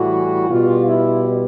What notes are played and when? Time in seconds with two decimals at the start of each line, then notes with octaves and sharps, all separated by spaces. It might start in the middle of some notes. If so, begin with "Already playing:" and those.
Already playing: A2 E3 G3 F#4
0.49 B2 G3 F4
0.85 E4